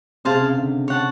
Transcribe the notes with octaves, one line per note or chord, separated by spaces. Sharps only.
C3 G#4 C5 F5 A5
C#3
D3
C#5 F#5 A5